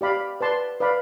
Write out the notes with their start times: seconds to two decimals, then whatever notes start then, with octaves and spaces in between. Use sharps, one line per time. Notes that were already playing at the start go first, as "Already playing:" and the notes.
0.01 G4 D5 F5 B5
0.41 B4 D5 A5 C6
0.80 B4 D5 F5 B5